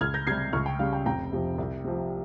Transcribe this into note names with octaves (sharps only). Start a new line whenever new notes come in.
C#2 F6 G#6
G6 A#6
C3 G3 G#6 C7
C#2 C#6 F6
G5
C#3 G3 F5
G5
F1 G5 A#5
F2 C3 F3
C2
C3 F3